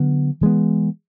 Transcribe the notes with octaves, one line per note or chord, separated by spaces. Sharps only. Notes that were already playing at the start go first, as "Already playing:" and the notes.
Already playing: D3 F#3 B3
E3 G#3 B3